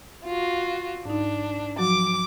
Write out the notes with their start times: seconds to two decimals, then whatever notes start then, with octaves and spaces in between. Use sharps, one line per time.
0.25 F4 F#4
1.05 G#2 D4 D#4
1.79 F3 F#3 F#4 D6